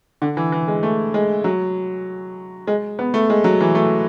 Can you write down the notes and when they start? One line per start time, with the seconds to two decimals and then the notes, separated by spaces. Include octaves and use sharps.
0.22 D3
0.37 E3
0.52 E3
0.68 G#3
0.83 A3
1.14 G#3
1.44 F#3
2.67 G#3
2.99 B3
3.14 A3
3.30 G#3
3.44 F#3
3.60 E3
3.75 A3